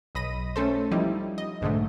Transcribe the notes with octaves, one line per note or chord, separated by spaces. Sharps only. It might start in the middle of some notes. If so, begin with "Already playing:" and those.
B1 D#5 B5 A#6 D#7
A3 C#4 A4 C5
F3 G3 D#4 E4
D#5
B1 G#2 D3 G#3 A3